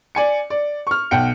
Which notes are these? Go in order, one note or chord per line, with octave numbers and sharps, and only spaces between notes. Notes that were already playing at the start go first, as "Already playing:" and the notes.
D5 G#5 C#7
D5
C#6 F6
B1 F#5 G5 C#7